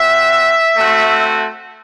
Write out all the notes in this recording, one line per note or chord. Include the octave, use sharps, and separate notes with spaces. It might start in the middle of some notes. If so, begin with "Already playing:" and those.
Already playing: C4 F#4 E5
A3 C4 F#4